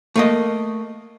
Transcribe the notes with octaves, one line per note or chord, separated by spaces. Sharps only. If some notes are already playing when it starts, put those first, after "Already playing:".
A3 A#3 D#5